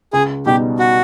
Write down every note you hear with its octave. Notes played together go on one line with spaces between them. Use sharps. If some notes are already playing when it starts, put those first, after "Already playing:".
C#2 G#4
B2 G3 B3 D#4 G4
F#4